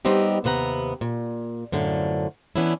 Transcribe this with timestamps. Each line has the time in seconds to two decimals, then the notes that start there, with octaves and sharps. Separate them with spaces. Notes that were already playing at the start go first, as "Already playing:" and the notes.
0.05 G3 B3 C4 D#4 G4
0.44 D#2 C3 B3 F#5 A#5
1.01 A#2
1.72 F#2 A2 D3 F3
2.56 E3 B3 C#4 D4 E4